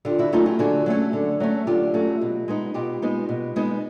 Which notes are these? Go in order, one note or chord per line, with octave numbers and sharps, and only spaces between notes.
D3 F4 G4
E4 F#4
F#3 A3 C#4 D#4 F4
F4 G4
D3 F#4 G#4
F#3 A3 C#4
D3
F#3 A3 C#4
D3 F4 G4
F#3 A3 C#4
B2
G#3 B3 D#4
B2 F4 G4
G#3 B3 D#4
B2
G#3 B3 D#4